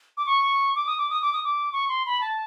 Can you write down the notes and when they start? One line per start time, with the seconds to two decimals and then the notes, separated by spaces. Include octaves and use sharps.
0.17 D6
0.26 C#6
0.75 D6
0.87 D#6
0.98 D6
1.10 D#6
1.22 D6
1.33 D#6
1.44 D6
1.72 C#6
1.89 C6
2.06 B5
2.21 A5